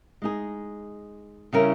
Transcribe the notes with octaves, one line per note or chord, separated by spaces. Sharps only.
G#3 D#4 G#4
C#3 G3 C#4 E4 A#4